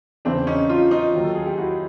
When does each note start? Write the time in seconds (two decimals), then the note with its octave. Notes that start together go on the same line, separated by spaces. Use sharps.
0.25 E2 C#3 E3 C4 D4
0.47 C#4 D#4
0.69 D#4 F4
0.91 D#4 F4
1.13 D#2 D#3 F#3
1.24 A4
1.35 G#4
1.46 G4
1.58 E4 F#4